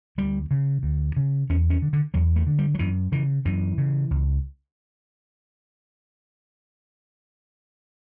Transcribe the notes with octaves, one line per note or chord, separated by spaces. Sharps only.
D2 G3
C#3
D2
C#3
E2 C#4
C#4
D3
D3
E2 F#3
A3
D3
G3
F#3
F#2 E3
C#3 E3
F#2 E3
C#3
C#2